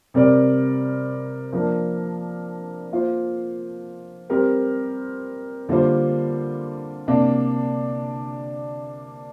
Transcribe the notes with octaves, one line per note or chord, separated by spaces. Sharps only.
C3 G3 C4 A#4 D5
F3 A#3 D4 A#4
A#3 F4 C5
G3 C4 G4 A#4
D3 G3 A#3 F4 C5
C3 A#3 D4